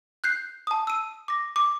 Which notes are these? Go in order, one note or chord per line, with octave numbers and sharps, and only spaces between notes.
F#6 G6 C7
A5 D#6
E6 D#7
D6 A#6
D6